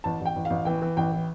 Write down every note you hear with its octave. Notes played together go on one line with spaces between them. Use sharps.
A1 A5
A1
G5
A1
F5
A1
E3 G5
E3
A1 G5
E3